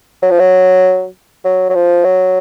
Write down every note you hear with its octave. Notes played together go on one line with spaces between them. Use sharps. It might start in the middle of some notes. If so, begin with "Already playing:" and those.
F#3
F3
F#3
F#3
F#3
F3
F#3